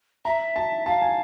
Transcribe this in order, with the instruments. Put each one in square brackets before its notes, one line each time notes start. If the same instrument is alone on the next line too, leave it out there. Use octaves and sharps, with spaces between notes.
[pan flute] E5 [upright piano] A#5
[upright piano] A5
[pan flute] F5 [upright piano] A5
[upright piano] G#5